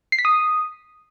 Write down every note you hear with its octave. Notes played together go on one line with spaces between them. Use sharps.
C7
B6
D#6